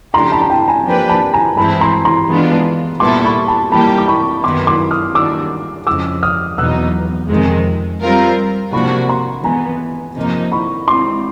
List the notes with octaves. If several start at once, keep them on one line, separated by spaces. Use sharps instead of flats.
C#3 F3 A3 D4 G4 A#5 C6
A5 B5
A#5
G5 A5
G#5 A#5
F3 A#3 D4 G4 B4
A5 B5
G#5 A#5
G2 E3 G#3 C4 E4 A5 B5
A#5 C6
A#5 C6
E3 G#3 B3 D4 F4
A#2 G3 B3 E4 A4 C6 D6
B5 C#6
A5 B5
E3 G3 A#3 D#4 G4 A5 B5
D6
B5 C#6
F#2 D#3 F#3 B3 E4 C6 D6
C6 D6
D#6 F6
D#3 G3 A#3 D4 F#4 D6 E6
F2 C#3 F3 G#3 D6 E6
D#6 F6
E2 B2 F#3 B3 D#4 E6 F#6
F2 C3 D#3 G#3
G3 C4 F4 A#4
C3 F3 A#3 D4 F#4 B5 C#6
A#5 C6
E3 G#3 B3 G#5 A#5
F2 C3 F3 A#3 D#4
B5 C#6
G#3 C4 F4 C6 D6